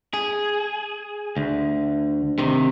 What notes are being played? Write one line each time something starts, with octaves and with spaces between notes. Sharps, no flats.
G#4
D2
C3 D#3